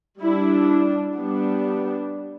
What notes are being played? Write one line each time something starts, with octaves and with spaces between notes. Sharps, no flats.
G3 D4 E4
G3 B3 D4